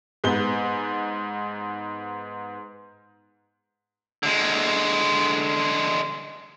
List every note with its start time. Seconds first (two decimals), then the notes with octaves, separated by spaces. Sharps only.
0.24 G#2 B3 G7
4.23 D3 G#3